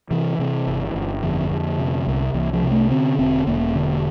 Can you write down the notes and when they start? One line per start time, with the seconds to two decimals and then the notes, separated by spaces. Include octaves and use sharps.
0.11 C3 E3
0.39 C3
0.67 G1
0.94 G1
1.22 F2 D3
1.51 F2
1.78 C3
2.07 C2
2.34 C2 E3
2.53 F3
2.63 C3
2.71 A3
2.91 D3 C4
3.19 E1 C4
3.47 E1 A#3
3.75 D3